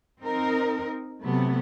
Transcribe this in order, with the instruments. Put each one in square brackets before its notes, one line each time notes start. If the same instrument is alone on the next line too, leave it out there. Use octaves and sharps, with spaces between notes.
[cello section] C4 D#4 A#4
C3 F#3 A3 B3